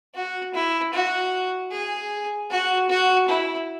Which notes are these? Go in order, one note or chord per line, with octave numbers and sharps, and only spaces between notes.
F#4
E4
F#4
G#4
F#4
F#4
E4